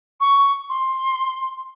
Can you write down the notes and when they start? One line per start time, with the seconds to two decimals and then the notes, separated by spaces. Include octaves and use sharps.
0.20 C#6
0.69 C6